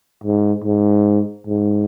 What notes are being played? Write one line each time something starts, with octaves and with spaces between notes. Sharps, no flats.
G#2
G#2
G#2